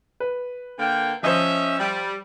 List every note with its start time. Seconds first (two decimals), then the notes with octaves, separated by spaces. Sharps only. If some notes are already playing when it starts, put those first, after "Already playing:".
0.20 B4
0.79 D3 A#3 G5
1.23 F3 C#4 C5 D#5 E5
1.79 G3